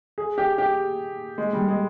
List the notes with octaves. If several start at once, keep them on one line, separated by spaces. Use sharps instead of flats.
G#4
G4
G4
G#3
G3
G#3